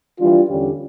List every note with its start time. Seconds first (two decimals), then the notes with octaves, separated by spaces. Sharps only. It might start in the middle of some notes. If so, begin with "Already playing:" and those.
0.19 E3 G3 D4 F4
0.48 E2 D3 G3 C#4 G4